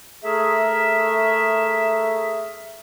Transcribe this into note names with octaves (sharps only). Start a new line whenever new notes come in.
A3 G#4 A#4 E5